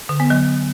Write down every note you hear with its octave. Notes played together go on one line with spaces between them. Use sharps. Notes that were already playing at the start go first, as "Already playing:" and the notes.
D3
B3
F#3